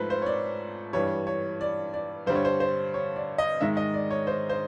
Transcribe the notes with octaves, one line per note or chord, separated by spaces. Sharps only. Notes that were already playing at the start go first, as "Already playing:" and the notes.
Already playing: G#2 F3 A3 B4 C5
C5
C#5
D5
G2 E3 G3 C#5
C#5
D5
D5
G2 D3 G3 C5
C#5
C5
C5
C#5
D5
D#5
G#2 D#3 G#3 E5
D#5
D5
C#5
C5
C5